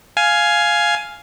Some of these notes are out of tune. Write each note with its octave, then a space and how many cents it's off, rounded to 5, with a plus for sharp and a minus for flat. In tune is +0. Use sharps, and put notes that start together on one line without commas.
F5 +0 G#5 +10